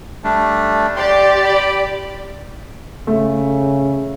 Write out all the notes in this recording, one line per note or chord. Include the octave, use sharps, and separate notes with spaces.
G3 A3 D4
G4 D5 C6
G5 B5
C#3 A3